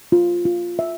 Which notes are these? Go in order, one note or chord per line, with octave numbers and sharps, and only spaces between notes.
F4
F4
E5